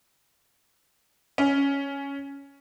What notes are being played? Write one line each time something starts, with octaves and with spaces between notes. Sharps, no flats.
C#4